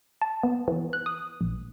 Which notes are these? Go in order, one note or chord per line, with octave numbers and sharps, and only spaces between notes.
A5
B3
E3
F#6
D#6
A#1